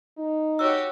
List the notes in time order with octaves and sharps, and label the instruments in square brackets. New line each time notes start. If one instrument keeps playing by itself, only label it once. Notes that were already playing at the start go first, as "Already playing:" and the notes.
[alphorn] D#4
[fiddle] F#4 G4 [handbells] C#5 E6